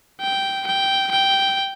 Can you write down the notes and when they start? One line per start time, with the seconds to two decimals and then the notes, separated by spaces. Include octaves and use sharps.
0.21 G5
0.67 G5
1.11 G5